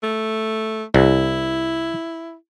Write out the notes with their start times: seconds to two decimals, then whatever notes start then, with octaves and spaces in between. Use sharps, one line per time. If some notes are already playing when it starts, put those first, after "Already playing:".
0.03 A3
0.94 C2 E4